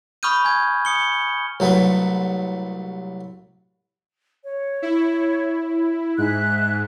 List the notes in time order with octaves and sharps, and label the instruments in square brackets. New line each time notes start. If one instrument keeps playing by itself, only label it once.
[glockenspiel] B5 C#6 D#6 F6 G6 D#7
G#5 G#6
D#6 C#7 G7
[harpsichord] C2 F#3 A3 B3
[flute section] C#5
[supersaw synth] E4
[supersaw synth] G#2 [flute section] G#4 E5 F#6